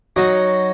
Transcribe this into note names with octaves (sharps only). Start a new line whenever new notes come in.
F#3 D#4 F#4